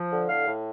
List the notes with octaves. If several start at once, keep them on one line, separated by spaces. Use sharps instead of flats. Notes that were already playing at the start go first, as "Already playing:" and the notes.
Already playing: F3
D3
A2 F5
A2